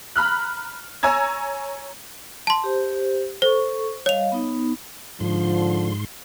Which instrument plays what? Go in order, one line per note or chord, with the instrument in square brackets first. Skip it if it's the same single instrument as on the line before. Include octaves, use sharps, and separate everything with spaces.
[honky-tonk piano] A#5 B5 F6 F#6
C#5 G#5 A#5 E6 G#6
[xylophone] A5 C6
[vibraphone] G4 C5
[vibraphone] A4 C#6 [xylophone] C5
[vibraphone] G3 D#5 F5 [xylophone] C#5 F7
[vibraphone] B3 D#4
[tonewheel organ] G#2 C6 [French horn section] D3 F3